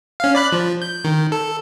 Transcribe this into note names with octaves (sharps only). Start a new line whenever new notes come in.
C#4 F5
D5 B5 F#6
F3
G6
D#3
A4